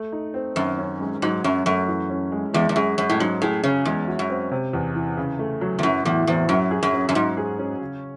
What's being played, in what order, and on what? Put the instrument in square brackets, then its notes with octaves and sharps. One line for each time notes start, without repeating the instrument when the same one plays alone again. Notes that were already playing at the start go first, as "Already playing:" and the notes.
Already playing: [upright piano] A3
D#4
C4
[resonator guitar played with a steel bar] F#2 [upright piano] D#3
[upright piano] C#4
G#3
[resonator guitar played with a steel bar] G#2 [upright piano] F#3
[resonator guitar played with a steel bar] F#2 [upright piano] C#4
[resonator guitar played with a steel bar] F#2 [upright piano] A3
[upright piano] E3
C#4
G#3
[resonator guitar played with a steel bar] E2 [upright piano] G#3
[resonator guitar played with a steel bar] E2
[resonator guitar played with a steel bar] F#2 [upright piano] G#4
[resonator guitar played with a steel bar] F#2 [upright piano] C#4
[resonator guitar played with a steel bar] A2
[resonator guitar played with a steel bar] G#2 [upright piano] F#3
[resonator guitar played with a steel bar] A2 [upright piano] G#4
[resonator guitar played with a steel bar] C#3 [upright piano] C#4
[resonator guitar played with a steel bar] E2 [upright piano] G#3
[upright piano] F#4
[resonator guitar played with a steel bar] F#2
[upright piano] C4
C3
E2
E3
C#3
A3
F#3
[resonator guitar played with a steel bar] E2
[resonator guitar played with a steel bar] F#2 [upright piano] E3
[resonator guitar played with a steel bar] E2 [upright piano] A2
[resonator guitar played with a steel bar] E2 [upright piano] C4
[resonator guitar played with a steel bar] F#2 [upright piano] F#3
[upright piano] G#4
[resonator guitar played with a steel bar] F#2
[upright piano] C#4
[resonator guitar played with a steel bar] F#2
[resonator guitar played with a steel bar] G#2 [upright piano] F#3
[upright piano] G#4
C#4
C#3